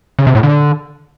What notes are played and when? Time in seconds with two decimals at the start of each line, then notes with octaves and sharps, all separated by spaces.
0.19 C#3
0.27 C3
0.35 A2
0.43 D3